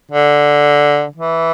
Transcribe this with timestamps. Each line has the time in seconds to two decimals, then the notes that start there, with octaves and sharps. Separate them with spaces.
0.11 D3
1.16 E3